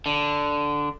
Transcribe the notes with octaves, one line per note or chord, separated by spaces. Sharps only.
D3